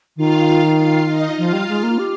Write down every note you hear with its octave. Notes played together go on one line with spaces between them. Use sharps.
D#3 F4 F5
F4 F5
D#4 D#5
F3 F4 F5
G3
G#3
A#3
G4